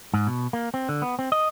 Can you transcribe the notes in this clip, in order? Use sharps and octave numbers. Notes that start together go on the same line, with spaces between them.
G#2
B2
A#3
C4
D3
B3
C4
D#5